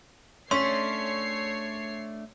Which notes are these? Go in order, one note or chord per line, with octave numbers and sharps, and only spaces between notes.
A3 C#4 D4 C#5 C6 B6 C7